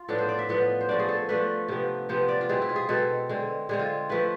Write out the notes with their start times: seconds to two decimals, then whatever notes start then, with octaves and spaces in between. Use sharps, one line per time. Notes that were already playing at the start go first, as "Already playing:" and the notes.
Already playing: F4
0.09 A2 F3 B3 D4 A4
0.18 C5
0.29 D5
0.39 E5
0.49 A2 F3 B3 D4
0.81 C5
0.89 F3 A3 D4 D5
0.99 G#4
1.09 A4
1.29 F3 A3 D4 B4
1.68 C3 F3 B3
2.09 C3 F3 B3 C5
2.29 D5
2.41 F4
2.49 B2 G#3 C4 E4 G#4
2.62 E4
2.69 F4
2.76 G#4
2.89 B2 G#3 C4 E4 A4
3.29 D3 G#3 C4
3.69 D3 G#3 C4 G#4
3.79 F4
4.09 F3 A3 E4 B4